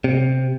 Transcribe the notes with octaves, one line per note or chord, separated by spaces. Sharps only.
C3